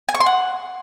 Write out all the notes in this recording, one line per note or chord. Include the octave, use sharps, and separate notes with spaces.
G#5
C#6
C6
F#5